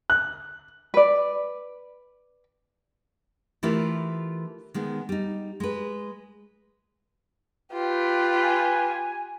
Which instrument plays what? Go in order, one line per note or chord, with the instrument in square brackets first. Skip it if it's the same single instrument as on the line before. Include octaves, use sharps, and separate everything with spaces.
[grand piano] F#6
[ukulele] B4 D5
[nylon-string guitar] E3 A3 E4 F4 G4 A#4
D#3 G#3 B3
G3 D#4
G#3 B4
[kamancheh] F4 G4 [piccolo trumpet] B4
[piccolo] G#5